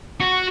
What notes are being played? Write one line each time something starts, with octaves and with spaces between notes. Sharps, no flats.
F#4